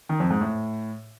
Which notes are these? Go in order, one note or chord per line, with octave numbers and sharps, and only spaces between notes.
D#3
F2
G#2
A2